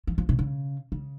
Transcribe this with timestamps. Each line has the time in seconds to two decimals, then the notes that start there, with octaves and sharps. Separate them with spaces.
0.07 F3
0.18 F3
0.29 C3
0.39 C#3
0.92 C#3